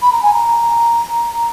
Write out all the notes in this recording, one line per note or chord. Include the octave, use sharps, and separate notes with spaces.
B5
A#5
G#5
A#5